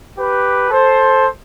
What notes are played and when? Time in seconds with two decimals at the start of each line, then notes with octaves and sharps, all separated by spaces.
0.18 G4 B4
0.71 A4 C5